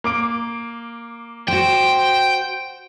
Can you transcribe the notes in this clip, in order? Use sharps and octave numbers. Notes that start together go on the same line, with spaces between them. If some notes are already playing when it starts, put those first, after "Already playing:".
A#3 D6 D7
F#4 C5 G5